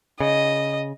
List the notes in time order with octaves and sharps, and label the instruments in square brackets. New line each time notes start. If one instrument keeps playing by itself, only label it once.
[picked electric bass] C#3 [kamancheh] D#5